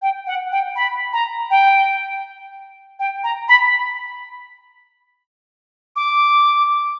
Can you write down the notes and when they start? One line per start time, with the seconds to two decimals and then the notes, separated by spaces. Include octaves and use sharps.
0.02 G5
0.27 F#5
0.52 G5
0.76 B5
1.13 A#5
1.50 G5
2.99 G5
3.24 A#5
3.48 B5
5.96 D6